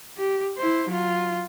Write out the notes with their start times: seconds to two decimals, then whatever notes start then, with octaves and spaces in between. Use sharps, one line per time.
0.18 G4
0.57 E4 C5
0.88 F#3 F4